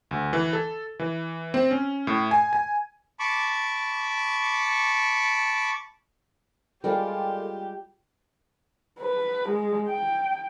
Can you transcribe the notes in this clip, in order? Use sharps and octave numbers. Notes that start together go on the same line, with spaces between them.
D2
E3
A4
E3
C4
C#4
A2
G#5
G#5
A5 B5 C#6 D6
G3 G#3 F4 G4 A4 A#4 D5
B4
G#3
G5